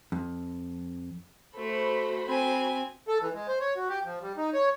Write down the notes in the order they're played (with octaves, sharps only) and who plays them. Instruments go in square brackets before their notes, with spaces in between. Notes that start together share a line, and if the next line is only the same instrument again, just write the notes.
[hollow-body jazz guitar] F2
[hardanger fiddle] A3 [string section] F#4 C5 B5
[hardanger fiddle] C4 G#5
[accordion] A4
E3
G#3
C5
C#5
F#4
G4
F3
G3
D#4
C#5